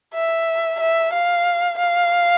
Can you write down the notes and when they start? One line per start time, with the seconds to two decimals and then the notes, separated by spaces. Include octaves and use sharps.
0.14 E5
0.80 E5
1.13 F5
1.78 F5